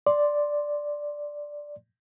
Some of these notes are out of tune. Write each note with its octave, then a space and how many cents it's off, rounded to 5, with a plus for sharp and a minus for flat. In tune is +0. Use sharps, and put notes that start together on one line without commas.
D5 +0 C6 +5